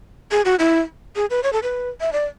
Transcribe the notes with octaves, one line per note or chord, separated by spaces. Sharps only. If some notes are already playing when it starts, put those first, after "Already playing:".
G#4
F#4
E4
G#4
B4
C#5
A4
B4
E5
D5